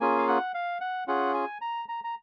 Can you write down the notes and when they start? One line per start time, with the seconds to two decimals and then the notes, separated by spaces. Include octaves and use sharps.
0.01 A#3 C#4 F4 G#4 G#5
0.18 F5
0.28 F#5
0.54 F5
0.81 F#5
1.07 C#4 F4 G#4 F#5
1.34 G#5
1.61 A#5
1.89 A#5
2.04 A#5